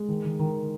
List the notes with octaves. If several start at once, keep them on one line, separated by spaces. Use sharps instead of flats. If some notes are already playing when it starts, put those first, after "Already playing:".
Already playing: G#3
D#3
D#3
D#3